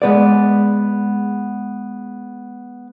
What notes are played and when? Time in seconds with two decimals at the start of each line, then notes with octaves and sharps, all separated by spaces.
0.02 G#3 B3 D5